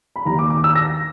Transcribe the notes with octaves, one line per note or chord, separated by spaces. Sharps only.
B5
D#2 D#3 A#5
D6
D6
E6
A#6